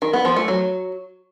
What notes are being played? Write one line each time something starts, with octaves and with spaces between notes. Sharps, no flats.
D#3
B3
F3
A3
F#3